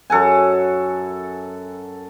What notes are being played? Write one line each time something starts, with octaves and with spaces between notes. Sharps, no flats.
F#2 A4 F#5 G#5